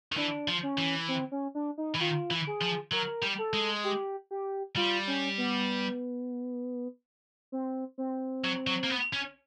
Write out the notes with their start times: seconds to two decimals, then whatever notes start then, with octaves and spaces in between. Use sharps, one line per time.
0.12 D#3
0.17 E3 D4
0.48 F3
0.63 C#4
0.78 E3
1.08 C4
1.32 C#4
1.55 D4
1.78 D#4
1.95 E3
2.00 D#3 F4
2.31 E3
2.47 G#4
2.62 F3
2.92 F#3 A#4
3.23 G3
3.38 A4
3.53 G#3
3.84 G4
4.31 G4
4.76 G3 F4
5.07 C#4
5.38 B3
7.52 C4
7.98 C4
8.44 F#3
8.67 F#3
8.84 A#3
8.90 B3
9.13 C#4